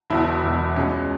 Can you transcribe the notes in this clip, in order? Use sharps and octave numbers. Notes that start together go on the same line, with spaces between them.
E1 E2 B2 E4
E1 E2 B2
C#2 B2 G#3 C#4